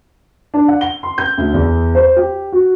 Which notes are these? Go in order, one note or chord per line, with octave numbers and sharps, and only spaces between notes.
D4
F#5
G7
C6
G6
D2
E2
C5
G4
F#4